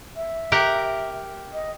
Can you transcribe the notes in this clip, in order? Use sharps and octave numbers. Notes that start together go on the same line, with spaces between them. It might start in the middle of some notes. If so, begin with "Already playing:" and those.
E5
G4 A#4 F#5
D#5